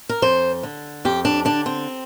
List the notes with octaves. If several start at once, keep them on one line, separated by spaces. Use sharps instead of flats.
A#4
F2 C5
D3
F2 G4
D4
D3 D4
C4